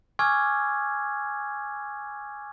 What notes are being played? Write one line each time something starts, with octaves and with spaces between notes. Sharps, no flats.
G#5 C#6 D6 E6 F6 G#6